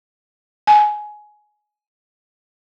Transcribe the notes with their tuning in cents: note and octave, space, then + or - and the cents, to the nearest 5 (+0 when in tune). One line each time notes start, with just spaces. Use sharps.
G#5 +15